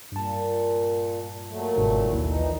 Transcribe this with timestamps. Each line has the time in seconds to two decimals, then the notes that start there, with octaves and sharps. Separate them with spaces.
0.12 G2 A#2 A5
1.50 A#2 F#3 A3
1.76 G1 G#2 B2
2.10 A#1 D#2 E4
2.28 A#2 E3 D#4